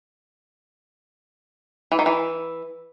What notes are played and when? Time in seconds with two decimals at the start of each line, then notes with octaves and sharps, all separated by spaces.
1.92 E3
1.99 D#3
2.06 E3